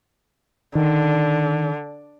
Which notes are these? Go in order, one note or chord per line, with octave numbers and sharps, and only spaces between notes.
D3 D#3